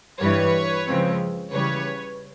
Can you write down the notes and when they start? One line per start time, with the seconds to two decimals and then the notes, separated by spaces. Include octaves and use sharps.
0.21 G2 E3 G3 B4 C#5
0.87 C#3 F3 G#3 C4
1.53 C#3 E3 G3 B4 C#5